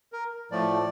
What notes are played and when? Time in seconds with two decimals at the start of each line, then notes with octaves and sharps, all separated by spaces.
0.12 A#4
0.51 A2 F3 A3 D5